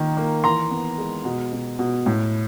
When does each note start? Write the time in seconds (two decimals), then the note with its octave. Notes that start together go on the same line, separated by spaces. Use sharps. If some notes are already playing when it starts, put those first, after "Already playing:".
Already playing: D#3 A#3
0.17 A#3
0.44 E3 A#5 C6
0.71 B3
0.98 G#3
1.25 B2
1.52 B2
1.79 B2
2.06 A2